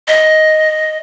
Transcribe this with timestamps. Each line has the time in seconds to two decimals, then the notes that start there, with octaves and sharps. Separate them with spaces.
0.08 D#5